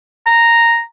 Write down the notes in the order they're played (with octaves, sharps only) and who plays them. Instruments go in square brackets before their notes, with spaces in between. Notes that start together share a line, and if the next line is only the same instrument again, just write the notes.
[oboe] A#5